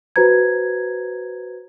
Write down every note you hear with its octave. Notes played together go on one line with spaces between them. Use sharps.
F#4 B4 C5 A#5 G#6